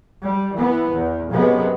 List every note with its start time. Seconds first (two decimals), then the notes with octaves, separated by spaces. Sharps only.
0.22 G3
0.55 E3 B3
0.93 E2
1.31 F#2 C3 G#3 B3